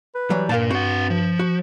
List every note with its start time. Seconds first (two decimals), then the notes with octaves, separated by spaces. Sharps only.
0.15 B4
0.30 E3 F#3 G3
0.49 G2 A#2 A#4 F5 A5
0.71 C4 F#4 F#5
1.10 F3
1.39 F#4